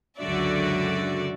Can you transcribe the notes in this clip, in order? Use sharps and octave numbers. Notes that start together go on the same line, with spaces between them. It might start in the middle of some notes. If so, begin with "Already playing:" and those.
C#2 F#2 D3 F#4 D5 E5